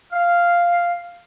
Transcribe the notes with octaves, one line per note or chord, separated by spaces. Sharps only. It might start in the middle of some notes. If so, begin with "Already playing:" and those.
F5